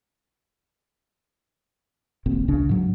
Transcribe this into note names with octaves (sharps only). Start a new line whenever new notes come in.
D#1 G#1 A#2 C4
C#2 C#3 D4
G#2 F#3